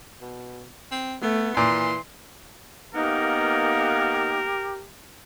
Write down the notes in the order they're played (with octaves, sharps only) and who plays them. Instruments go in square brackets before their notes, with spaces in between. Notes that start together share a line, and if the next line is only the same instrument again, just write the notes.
[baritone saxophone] B2
C4
[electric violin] A3 [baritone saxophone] B3
[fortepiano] A#2 [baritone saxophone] E3 [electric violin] C6
[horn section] A#3 B3 [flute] D#4 [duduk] G4 [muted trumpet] A#4